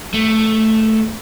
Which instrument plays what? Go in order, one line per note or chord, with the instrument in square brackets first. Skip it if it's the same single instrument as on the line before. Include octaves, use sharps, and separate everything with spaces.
[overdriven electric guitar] A3